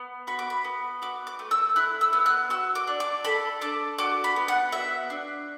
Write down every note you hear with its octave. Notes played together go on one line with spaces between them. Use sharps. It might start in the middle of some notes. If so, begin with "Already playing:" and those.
Already playing: B3
F#4 B5
D6
B5
B3
F#4 D6
D6
A3
E6
E4 F#6
E6
B3
F#6
F#4 E6
D6
D4
D6
A4 B5
D4 D6
F#4 D6
B5
B3
F#5
F#4 E5
D4